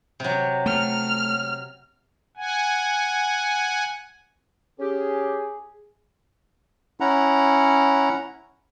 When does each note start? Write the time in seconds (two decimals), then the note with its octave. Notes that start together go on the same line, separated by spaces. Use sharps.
0.20 C3 F#3
0.66 A3 F6
2.37 F#5 G#5
4.80 C#4 G4 G#4
7.00 C#4 E4 F#5 A#5